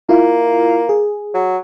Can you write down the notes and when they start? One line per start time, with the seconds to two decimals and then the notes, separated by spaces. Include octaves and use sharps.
0.09 A#3 E4 F4
0.89 G#4
1.34 F#3